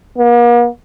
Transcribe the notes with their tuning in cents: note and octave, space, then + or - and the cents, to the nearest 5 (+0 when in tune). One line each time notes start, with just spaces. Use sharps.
A#3 +45